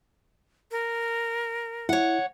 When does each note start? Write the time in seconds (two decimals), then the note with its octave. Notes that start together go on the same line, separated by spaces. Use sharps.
0.71 A#4
1.89 E4 C#5 F#5